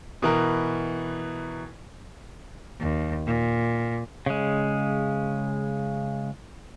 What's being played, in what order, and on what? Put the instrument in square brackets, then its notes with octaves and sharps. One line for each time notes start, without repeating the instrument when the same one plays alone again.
[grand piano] B2 E3 A#4
[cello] D#2
A#2
[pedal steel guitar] C#3 G#3